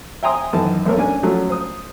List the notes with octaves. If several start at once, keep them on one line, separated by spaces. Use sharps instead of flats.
E5 G5 G#5 A#5 C6 D#6
F#2 D#3 E3 A5
B1 A3 A#3 A#4 C#5
C#4 D4 G#5
F3 F#3 A3 C#4
C5 D#6